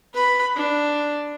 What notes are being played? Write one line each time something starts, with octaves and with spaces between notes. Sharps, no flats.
B4 B5
D4